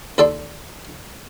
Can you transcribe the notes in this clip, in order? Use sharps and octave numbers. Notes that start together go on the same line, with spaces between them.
D#2 A4 D5 C6